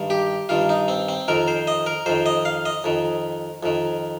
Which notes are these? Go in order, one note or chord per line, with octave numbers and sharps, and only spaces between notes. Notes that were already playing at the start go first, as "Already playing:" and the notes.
Already playing: G2 D#3
G4
G2 D#3 F4
D#4
C4
C4
F2 D#3 A#4
C5
D#5
A#4
F2 D#3 C5
D#5
F5
D#5
F2 D#3
F2 D#3